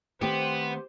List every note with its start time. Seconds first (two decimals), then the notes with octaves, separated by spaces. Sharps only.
0.22 D#3 A3 B3 C4 G4 C5